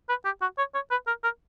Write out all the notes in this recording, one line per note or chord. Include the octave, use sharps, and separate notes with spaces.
B4
G4
F#4
C#5
C#5
B4
A#4
A#4